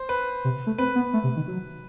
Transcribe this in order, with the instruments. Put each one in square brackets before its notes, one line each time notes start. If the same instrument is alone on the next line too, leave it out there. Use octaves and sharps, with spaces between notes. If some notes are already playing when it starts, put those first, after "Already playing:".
Already playing: [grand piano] C5
B4
[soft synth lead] C3
A3
[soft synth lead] C4 [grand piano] B4
[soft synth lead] B3
A3
C3
D#3
F#3